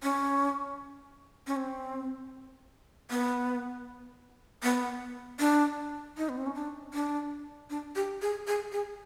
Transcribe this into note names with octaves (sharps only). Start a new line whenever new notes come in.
C#4
C#4
C4
B3
B3
D4
D#4
B3
C4
C#4
D4
D4
D4
G4
G#4
G#4
G#4